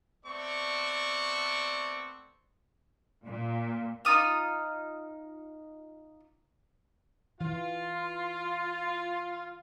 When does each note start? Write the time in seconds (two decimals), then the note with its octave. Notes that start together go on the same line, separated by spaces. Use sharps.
0.25 A3 B3 C4 D5 C#6
3.25 A#2
4.05 D#4 F4 D#6 F6
7.41 E3 F4